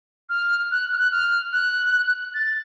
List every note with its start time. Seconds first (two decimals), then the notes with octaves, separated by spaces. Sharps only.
0.29 F6
0.71 F#6
0.92 F6
0.98 F#6
1.11 F6
1.53 F#6
2.34 A6